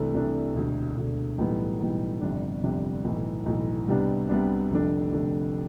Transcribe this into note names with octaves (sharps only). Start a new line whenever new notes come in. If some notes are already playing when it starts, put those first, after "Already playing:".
Already playing: C2 C3 E3 A3 D4
C2 C3 E3 A3 D4
E1 D2 D3
E1 D2 D3
B1 A2 E3 G3 B3
B1 A2 E3 G3 B3
G1 F2 C3 G3 D4
G1 F2 C3 G3 D4
B1 A2 E3
B1 A2 E3
C2 C3 G3 B3 D4
C2 C3 G3 B3 D4
F1 F2 D3 A3 D4
F1 F2 D3 A3 D4